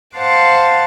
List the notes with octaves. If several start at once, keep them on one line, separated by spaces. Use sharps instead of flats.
C5 F5 F#5 A5 D6